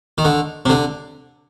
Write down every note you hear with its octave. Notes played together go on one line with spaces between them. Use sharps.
D#3
D3
C3
D3